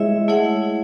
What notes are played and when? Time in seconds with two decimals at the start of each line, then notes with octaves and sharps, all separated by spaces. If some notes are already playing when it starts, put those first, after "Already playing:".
Already playing: G#3 E4 G#4 C#5 E5
0.28 A3 E4 G#4 C#5 F#5